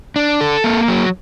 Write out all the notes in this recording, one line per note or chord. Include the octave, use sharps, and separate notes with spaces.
D4
A4
A#3
F#3